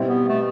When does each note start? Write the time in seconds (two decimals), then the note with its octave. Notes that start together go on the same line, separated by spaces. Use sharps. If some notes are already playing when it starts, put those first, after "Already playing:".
Already playing: B2 G3 C4 E4
0.08 B3
0.28 A3